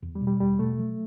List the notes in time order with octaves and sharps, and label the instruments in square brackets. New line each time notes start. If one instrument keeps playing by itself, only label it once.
[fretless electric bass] E2
[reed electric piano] G3
[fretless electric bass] B2
[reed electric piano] G3
[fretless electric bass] E2 [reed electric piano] G3
[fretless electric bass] B2 [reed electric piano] A3
[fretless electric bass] F#3